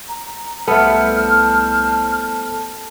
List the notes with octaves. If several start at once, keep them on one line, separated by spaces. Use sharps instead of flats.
A#5
C2 A3 B3 A4 C5 A5 F6